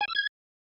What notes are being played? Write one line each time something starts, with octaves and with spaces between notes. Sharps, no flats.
G#5
E6
G#6